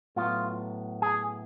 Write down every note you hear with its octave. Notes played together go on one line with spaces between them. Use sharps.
A2 F#3 B3 F4
G#4